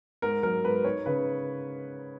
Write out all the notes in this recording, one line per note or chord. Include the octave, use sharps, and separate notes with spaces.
G#2 A#4
F#3 A#4
G#2 B4
D#4 C#5
C#3 B4